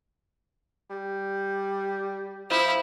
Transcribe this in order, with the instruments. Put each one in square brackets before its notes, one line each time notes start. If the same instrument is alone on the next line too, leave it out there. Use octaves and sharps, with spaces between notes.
[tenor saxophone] G3
[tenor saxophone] F3 [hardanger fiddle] E4